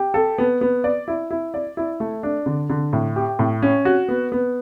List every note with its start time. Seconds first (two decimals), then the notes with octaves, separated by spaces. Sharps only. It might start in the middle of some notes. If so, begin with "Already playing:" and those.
Already playing: G4
0.14 A4
0.38 B3
0.61 B3
0.84 D5
1.08 E4
1.31 E4
1.54 D5
1.77 E4
2.00 A3
2.23 D4
2.46 D3
2.70 D3
2.93 A2
3.16 G4
3.39 A2
3.62 C#4
3.85 F#4
4.09 B3
4.32 B3